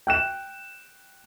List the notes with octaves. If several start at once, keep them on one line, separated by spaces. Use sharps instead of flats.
G5 F#6 E7